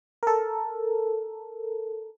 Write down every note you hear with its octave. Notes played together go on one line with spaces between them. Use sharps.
A4 A#4